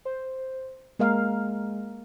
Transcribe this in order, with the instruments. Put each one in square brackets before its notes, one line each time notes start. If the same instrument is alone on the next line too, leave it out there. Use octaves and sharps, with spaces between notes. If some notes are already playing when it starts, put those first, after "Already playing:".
[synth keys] C5
[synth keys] G#3 [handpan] A#3 A#4 F5